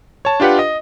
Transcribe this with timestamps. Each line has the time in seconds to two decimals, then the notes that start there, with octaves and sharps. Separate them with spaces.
0.25 C#5 A5
0.40 D4 F4 G4 B4 F#5
0.59 D#5